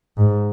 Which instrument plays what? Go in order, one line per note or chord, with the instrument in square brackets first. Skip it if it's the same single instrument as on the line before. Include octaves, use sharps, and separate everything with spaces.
[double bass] G#2